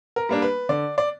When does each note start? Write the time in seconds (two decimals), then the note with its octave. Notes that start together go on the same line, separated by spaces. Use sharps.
0.16 A#4
0.29 G3 A#3 D4
0.42 B4
0.69 D3 D5
0.98 D5